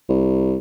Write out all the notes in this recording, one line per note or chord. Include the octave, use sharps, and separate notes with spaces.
C2